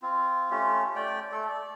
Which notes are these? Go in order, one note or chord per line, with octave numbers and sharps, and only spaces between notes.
C4 F4
A3 C#4 F4 G4
A3 D5 G5
A3 A4
D5